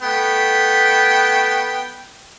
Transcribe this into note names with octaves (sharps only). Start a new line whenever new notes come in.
A3 B3 G5